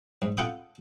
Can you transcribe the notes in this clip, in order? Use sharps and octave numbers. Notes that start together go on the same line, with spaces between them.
G#2
F4 A4 F#5 G5 B5 D#6